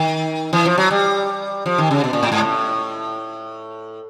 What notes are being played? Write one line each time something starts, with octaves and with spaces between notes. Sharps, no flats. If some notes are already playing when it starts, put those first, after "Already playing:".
Already playing: D#3
E3
F3
F#3
G3
F3
D#3
C#3
B2
A#2
A2
G#2
A2